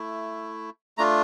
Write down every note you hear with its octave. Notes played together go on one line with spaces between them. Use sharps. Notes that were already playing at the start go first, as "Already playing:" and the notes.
Already playing: A3 E4
A3 D4 F4 A#5